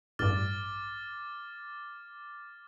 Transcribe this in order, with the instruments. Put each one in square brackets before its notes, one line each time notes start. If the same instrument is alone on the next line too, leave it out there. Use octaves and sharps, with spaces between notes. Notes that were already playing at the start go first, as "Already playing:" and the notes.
[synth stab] A1 G2 [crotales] D6 F6 A6